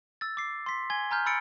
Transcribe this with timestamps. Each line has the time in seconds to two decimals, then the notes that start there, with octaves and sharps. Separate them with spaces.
0.21 E6 A6
0.37 D6 C7
0.66 C6 B6
0.90 G#5 G#6 G7
1.11 G#5 A#5 F6 G6
1.26 B5 E6 A6 C#7 D7